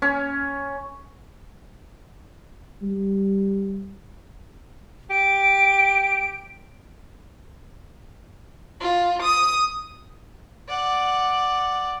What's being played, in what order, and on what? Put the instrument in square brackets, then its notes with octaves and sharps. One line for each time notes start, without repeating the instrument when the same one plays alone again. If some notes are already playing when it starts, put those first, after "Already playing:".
[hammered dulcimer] C#4
[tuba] G3
[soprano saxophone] G4 [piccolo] D7
[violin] F4
D#6
[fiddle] D5 F#5